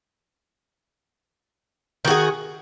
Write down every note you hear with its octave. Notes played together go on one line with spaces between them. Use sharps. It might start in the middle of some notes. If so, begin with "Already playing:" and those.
D#3 F#4 G#4